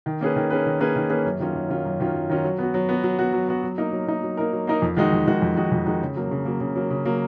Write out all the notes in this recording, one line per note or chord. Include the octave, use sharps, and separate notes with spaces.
D#3
A#3 C#4 G#4 B4
D#3
A#3 C#4 G#4 B4
D#3
A#3 C#4 G#4 B4
D#3
A#3 C#4 G#4 B4
F#2
D#3 F#3 C#4 F4
F#2
D#3 F#3 C#4 F4
F#2
D#3 F#3 C#4 F4
F#2
D#3 F#3 C#4 F4
F#3
B3 F#4
F#3
B3 F#4
F#3
B3 F#4
F#3
B3 F#4
F#3
A#3 D#4 A#4
F#3
A#3 D#4 A#4
F#3
A#3 D#4 A#4
F#3
A#3 D#4 A#4
F2
D#3 G#3 D#4 F#4
F2
D#3 G#3 D#4 F#4
F2
D#3 G#3 D#4 F#4
F2
D#3 G#3 D#4 F#4
C#3
F#3 A#3
C#3
F#3 A#3
C#3
F#3 A#3
C#3
F#3 A#3